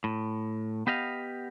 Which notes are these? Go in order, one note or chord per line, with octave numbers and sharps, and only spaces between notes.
A2
B3 G4 D#5 F5